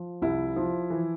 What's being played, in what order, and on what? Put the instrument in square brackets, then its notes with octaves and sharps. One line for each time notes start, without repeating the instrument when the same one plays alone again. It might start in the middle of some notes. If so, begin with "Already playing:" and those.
Already playing: [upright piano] F3
C2 E4
F3
E3